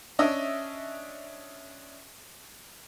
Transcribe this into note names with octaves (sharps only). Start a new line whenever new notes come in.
C#4 D4 D#5 E5